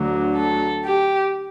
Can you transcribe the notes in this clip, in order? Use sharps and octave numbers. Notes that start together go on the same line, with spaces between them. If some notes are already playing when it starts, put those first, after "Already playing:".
Already playing: D2 D3 F#3
A4
G4